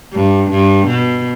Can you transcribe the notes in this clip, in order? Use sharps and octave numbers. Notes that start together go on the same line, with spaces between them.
G2
G2
B2